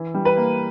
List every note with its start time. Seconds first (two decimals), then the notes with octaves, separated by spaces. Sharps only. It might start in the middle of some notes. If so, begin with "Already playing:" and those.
Already playing: E3
0.14 G3
0.25 B4
0.37 A#3